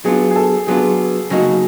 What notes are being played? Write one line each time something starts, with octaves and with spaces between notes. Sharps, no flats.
F#3 B3 D4 F4 G#4
G#4
A4
F#3 B3 D4 F4 G#4
C#3 F#3 A#3 D#4 F#4